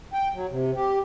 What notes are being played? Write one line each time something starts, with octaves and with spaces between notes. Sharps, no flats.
G5
F#3
C3
G4